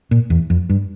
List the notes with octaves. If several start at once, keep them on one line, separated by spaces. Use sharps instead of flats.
A#2
E2
F2
G2